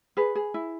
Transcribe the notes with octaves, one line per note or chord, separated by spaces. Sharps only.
G#4 B4
G#4
E4